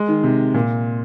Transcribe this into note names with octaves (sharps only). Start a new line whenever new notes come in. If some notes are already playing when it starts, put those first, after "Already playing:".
Already playing: G#3
D#3
C3
A#2